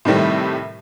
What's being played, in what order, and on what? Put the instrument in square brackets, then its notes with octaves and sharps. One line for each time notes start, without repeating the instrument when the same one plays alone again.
[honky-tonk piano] A2 C3 D#3 G3 A3 C4